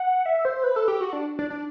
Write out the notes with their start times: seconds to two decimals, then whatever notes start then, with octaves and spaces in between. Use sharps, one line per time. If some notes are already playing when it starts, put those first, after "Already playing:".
Already playing: F#5
0.26 E5
0.45 C5
0.64 B4
0.76 A4
0.88 G4
1.01 F#4
1.13 D4
1.39 D4
1.50 D4